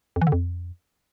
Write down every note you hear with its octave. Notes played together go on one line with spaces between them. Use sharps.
F2
E3
D3
F2